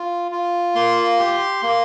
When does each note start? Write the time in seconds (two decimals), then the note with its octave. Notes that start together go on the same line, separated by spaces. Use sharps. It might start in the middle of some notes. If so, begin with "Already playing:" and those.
Already playing: F4
0.32 F4
0.75 A#3 C6
1.19 G4
1.63 A#3